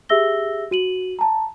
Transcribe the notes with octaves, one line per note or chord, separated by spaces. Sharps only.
G4 G#4 E5 E6 A#6 G7
F#4 D#7 F#7
A5 A#5